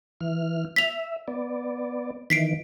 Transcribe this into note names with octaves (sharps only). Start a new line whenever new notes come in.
E3 F6
E5 B6 F7
B3 D5
D#3 E3 B6 C7 D7